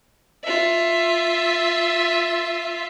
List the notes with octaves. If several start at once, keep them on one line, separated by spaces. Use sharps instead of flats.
F4 E5